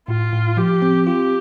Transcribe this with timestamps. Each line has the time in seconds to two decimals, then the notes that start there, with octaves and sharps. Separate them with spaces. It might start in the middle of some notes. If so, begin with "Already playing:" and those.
0.08 A2 F4
0.33 A2
0.57 F3 G4
0.82 C4
1.07 F4 G4